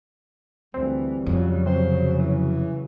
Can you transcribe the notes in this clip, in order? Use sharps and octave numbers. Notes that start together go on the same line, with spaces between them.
D2 E3 G3 C4
F2 C#3 F#3
C3 C5
E3